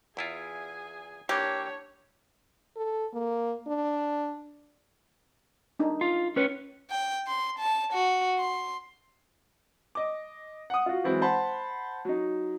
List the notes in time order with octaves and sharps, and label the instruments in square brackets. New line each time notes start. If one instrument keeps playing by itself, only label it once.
[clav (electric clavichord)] E2 E4 F4 [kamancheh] G#4 G#5
[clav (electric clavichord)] E3 A#3 [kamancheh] D4 C#5 [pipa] G4
[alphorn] A4
A#3
D4
[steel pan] D4 D#4
[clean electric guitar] F4
C#4 B4 C#5
[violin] G5
C6
A5
F#4
C6
[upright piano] D#5 D6
F#5 D#6
F4 F#4
E3 F#3 G#3 C4 E4
C5 F#5 A5 B5 C6
F#3 D#4